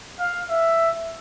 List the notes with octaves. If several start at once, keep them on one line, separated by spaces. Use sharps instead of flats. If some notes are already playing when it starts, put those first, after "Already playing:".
F5
E5